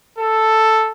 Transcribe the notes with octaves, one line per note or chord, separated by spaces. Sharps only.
A4